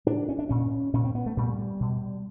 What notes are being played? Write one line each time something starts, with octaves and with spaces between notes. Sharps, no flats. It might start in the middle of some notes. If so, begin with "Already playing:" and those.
A2 D4
C#4
D4
A#2 C#4
A#2 C#4
C4
B3
A3
A#2 G3
B2